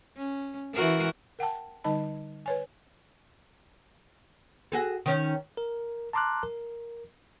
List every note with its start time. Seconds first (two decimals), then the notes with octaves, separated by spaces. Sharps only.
0.17 C#4
0.73 E3 F#4 A#4
1.39 A#4 F#5 G5 A5
1.84 D3 G3 D#4 D#5 A5 B5
2.46 B4 C#5 G#5
4.72 F#4 G#4 A4
5.06 D#3 C#4 D#4
5.57 A#4
6.13 A5 A#5 C6 D6 F6 F#6
6.43 A#4